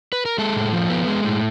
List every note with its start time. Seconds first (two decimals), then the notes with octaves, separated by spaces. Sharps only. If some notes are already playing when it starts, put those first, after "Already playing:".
0.13 B4
0.26 A#4
0.38 G#3 A4
0.56 A2
0.73 F3
0.90 B3
1.08 G#3
1.25 A2